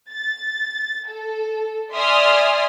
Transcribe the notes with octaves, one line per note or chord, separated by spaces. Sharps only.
A6
A4
D5 E5 G#5 C6 D#6 F6